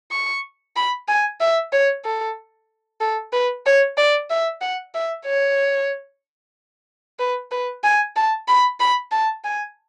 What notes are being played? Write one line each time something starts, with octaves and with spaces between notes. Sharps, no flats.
C#6
B5
G#5
E5
C#5
A4
A4
B4
C#5
D5
E5
F#5
E5
C#5
B4
B4
G#5
A5
B5
B5
A5
G#5